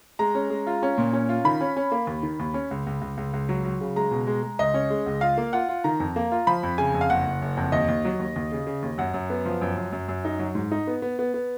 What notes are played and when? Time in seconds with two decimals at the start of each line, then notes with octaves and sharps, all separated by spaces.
0.19 G#3 A#5
0.35 C#4
0.50 G#3
0.67 F4
0.83 C#4
0.98 A#2
1.13 C#4
1.29 F4
1.45 D#3 B5
1.61 C#4
1.76 C#4
1.92 A#3
2.07 D#2
2.23 D#3
2.40 D#2
2.54 C#4
2.71 C#2
2.86 C#2
3.01 C#2
3.17 C#2
3.33 C#2
3.49 F#3
3.65 F#3
3.81 C#3
3.96 G#3 A#5
4.11 B2
4.27 G#3
4.43 G#3
4.59 C#2 D#5
4.74 C#4
4.90 G#3
5.06 C#2
5.21 F4 F5
5.37 A#3
5.53 F4 F#5
5.69 F4
5.84 D#3 A#5
6.00 F2
6.16 A#3
6.32 F4
6.47 F3 B5
6.63 F2
6.78 C#3 G#5
6.94 F2
7.01 F5
7.10 F#1 F#5
7.26 F#1
7.42 F#1
7.57 F2
7.72 D#2 D#5
7.89 D#2
8.05 F#3
8.19 D#2
8.36 D#2
8.52 C#3
8.67 C#3
8.83 D#2
8.98 F#2 F#5
9.14 F#2
9.30 B3
9.46 F3
9.61 F#2
9.77 F#2
9.92 F#2
10.08 F#2
10.25 D#4
10.39 F#3
10.55 G#2
10.72 D#4
10.87 B3
11.02 B3
11.19 B3
11.34 B3